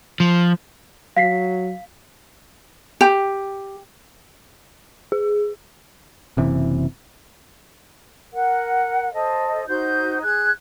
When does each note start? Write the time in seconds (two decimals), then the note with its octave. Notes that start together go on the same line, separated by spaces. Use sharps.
0.20 F3
1.17 F#3 F5 B6 C7
3.01 G4
5.12 G#4
6.37 F#1 C3 E3
8.33 A#4 F#5
9.13 A4 C5 D#5
9.68 D#4 F#4 C5 G6
10.22 G#4 F#6 G#6